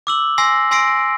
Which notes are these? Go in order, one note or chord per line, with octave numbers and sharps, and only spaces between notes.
D6 E6 F#7
G#5 C6 E6 A#6 C7
G#5 C6 E6 A#6 C7 D7